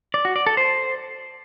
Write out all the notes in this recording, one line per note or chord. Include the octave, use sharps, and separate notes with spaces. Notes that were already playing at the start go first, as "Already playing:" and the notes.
D5
F#4
D5
A4
C5